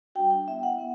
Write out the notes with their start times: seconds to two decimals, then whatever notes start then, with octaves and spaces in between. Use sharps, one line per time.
0.15 G3 D4 F#4 G5
0.31 G5
0.47 B3 E4 E5
0.63 F#5
0.79 B3